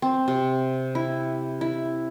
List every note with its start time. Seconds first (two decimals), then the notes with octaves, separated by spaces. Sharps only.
0.02 C4
0.28 C3
0.95 E4
1.61 E4